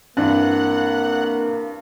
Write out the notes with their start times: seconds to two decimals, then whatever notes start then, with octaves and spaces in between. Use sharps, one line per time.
0.17 G2 E3 A#3 C4 D4 F#5